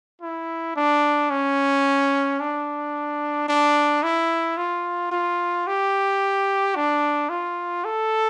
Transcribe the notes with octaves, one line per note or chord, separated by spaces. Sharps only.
E4
D4
C#4
D4
D4
E4
F4
F4
G4
D4
F4
A4